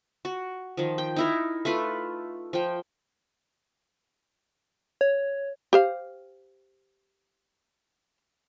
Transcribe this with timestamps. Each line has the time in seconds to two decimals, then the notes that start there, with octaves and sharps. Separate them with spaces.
0.25 F#4
0.77 D#3 F3
0.98 G5
1.16 D#4 E4 A#4
1.65 A3 F4 B4
2.53 F3 G5
5.01 C#5
5.73 G4 C5 F5